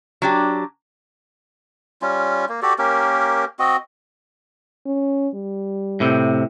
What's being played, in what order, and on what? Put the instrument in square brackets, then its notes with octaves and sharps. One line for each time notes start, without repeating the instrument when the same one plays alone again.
[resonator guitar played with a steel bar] F#3 D4 G4
[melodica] G3 C#4 F4
A#3
F#4 G4 A4 D5
A#3 C#4 G4 A#4
C4 F#4 D#5
[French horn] C#4
G3
[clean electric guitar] A2 C3